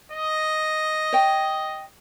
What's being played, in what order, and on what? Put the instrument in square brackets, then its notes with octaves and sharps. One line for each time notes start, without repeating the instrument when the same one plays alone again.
[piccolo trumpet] D#5
[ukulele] C#5 G5